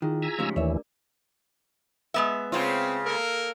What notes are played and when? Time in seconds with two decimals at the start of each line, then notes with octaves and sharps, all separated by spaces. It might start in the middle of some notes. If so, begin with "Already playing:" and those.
0.02 D#3 E4 F4 G#4
0.22 G#5 A#5 E6 B6
0.39 G#2 C#3 F3 A3 G4
0.56 D#2 E3 D4 A#4 C#5 D5 E5
2.14 G#3 B3 E5
2.52 C#3 C4 F4
3.05 A#3 A4 A#4